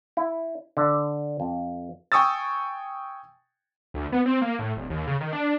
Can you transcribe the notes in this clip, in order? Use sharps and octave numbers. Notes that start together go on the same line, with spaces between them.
E4
D3
F2
G5 G#5 C#6 D#6 E6 A6
D2
B3
C4
A#3
A2
D1
D#2
C#3
D#3
D4